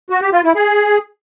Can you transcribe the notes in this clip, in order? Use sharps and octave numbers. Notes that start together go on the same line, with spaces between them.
F#4
G4
F4
E4
G#4